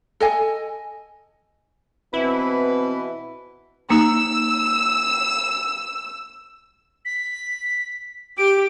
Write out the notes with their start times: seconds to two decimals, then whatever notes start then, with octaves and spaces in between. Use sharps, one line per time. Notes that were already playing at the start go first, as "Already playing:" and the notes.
0.20 A4 D#5 G#5
2.14 B2 E3 C4 E4 B4
3.90 A#3 D#4 E6
7.05 B6
8.38 G4 D7